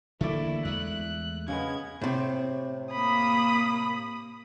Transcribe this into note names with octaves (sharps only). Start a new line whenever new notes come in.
D3 E3 A3 A#3 E4 D5
E2 G#3 A3 E5 F#6
C#3 G#3 B3 G#6
A2 C3
A#3 B5 D#6